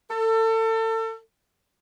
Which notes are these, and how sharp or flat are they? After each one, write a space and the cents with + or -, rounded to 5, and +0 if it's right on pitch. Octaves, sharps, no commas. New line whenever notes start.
A4 +30